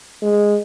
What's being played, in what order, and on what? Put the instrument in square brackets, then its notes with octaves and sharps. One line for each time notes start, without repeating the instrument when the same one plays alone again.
[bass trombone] G#3